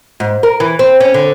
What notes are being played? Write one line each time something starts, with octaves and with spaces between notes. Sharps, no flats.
G#2
A#4
E3
C4
C#4
D3